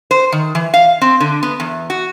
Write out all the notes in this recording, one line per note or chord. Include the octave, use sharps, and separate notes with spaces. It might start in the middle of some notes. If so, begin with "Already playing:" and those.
C5
D#3
E3
F5
C4
D3
B3
E2
F#4